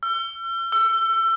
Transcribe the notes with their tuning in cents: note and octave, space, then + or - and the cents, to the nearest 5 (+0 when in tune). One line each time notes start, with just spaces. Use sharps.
E6 +45
E6 +30